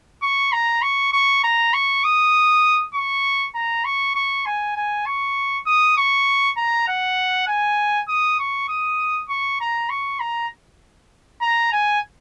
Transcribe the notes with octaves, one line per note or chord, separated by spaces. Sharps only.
C#6
A#5
C#6
C#6
A#5
C#6
D#6
C#6
A#5
C#6
C#6
G#5
G#5
C#6
D#6
C#6
A#5
F#5
G#5
D#6
C#6
D#6
C#6
A#5
C#6
A#5
A#5
G#5